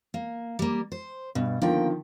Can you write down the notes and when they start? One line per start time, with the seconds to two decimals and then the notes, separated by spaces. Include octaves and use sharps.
0.14 A#3
0.59 G3 A#3
0.92 C5
1.35 G2 B2
1.62 D3 D#3 F3 A#3 G5